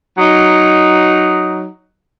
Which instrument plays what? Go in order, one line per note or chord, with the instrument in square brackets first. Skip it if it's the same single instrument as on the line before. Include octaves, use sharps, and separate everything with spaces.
[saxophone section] F#3 D#4